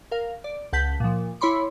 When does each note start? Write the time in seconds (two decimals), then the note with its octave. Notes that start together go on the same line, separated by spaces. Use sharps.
0.11 A#4 F5
0.44 D5
0.73 C#2 F#5 A5 G6 B6
1.00 A#2 F3
1.41 E4 C#5 B5 C6 D6